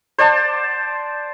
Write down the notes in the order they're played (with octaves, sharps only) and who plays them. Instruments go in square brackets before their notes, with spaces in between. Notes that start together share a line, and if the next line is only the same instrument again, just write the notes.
[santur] C5 D5 F#5 A5